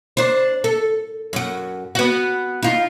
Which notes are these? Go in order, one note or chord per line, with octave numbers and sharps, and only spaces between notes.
D4 C5
A4
F#2 F#4
B3 F#4
D#4 F4